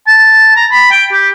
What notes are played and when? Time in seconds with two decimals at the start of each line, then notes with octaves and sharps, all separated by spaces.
0.07 A5
0.56 A#5
0.71 B5
0.91 G5
1.12 G4